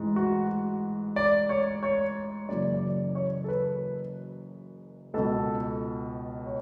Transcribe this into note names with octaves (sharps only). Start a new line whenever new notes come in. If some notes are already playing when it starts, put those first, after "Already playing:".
Already playing: A1 G#2 E3
F#4
D5
C#5
C#5
F#1 F#2 C#3 E3 D5
D5
C#5
A4
B4
C#2 B2 A4
C#5